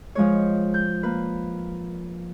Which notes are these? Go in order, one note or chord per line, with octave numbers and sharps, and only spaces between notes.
F3 G#3 C#5
G6
A#3 B4